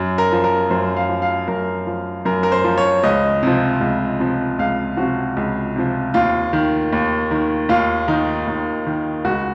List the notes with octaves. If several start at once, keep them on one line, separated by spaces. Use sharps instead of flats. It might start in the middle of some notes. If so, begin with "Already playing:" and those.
Already playing: F#2
A#4
F3
A#4
F#2 C5
F5
F3
F5
F#2 A#4
F3
F#2 A#4
A#4
C5
F3
C#5
C#2 D#5
C3 F3
C#2
C3 F3
C#2 F5
C3 F3 F#4
C#2
C3 F3
D#2 F4
D#3
D#2
D#3
D#2 F4
D#3 D#4
D#2
D#3
C#2 F#4